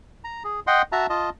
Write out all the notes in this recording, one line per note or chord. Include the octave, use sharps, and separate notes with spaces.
A#5
G#4
D#5 F#5 G5 C6
F#4 E5 A5 A#5
F4 D#5 A5